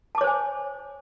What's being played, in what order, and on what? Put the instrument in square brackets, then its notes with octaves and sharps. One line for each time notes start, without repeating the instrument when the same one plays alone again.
[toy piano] A5
D6
C#5
C5
G#5